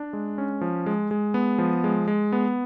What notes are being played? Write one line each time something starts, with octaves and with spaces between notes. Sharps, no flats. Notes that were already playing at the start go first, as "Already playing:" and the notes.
Already playing: D4
G#3
C#4
F3
G#3
G#3
B3
F3
G#3
G#3
B3